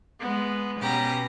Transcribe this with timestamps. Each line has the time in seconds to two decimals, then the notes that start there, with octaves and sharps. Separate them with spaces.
0.20 G#3 B3
0.80 B2 C#4 G4 A#5